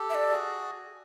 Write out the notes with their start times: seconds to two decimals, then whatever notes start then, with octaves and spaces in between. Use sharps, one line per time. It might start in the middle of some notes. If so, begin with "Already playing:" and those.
Already playing: G4 A4
0.10 E5
0.15 D5
0.31 F#4 G#4